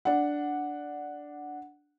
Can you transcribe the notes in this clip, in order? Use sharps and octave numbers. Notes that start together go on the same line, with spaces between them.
D4 F#5